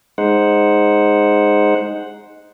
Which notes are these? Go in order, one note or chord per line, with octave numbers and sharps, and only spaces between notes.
G#3 D#4 C5 F#5